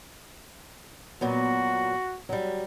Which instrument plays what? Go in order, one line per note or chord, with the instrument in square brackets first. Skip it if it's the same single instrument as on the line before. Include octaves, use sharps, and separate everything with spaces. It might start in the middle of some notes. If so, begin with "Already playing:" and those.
[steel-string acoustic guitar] A#2 F#3 B3 [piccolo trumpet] F#4
[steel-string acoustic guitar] F#3 G3